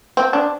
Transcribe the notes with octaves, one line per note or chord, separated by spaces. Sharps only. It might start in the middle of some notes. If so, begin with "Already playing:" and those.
C4
D4